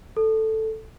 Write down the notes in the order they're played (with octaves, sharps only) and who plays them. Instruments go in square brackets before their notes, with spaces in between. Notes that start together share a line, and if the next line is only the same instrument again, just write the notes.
[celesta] A4